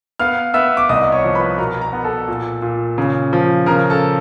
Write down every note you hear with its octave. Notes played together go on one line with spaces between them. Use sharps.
B3 F5 F6
B3 E5 E6
D6
C2 D#5 D#6
C#5 C#6
F3
B4 B5
B2 A#4 A#5
A#4 A#5
B3
A4 A5
A#2
A#2
C#3
F3
C#3 A#4 A#5
A4 A5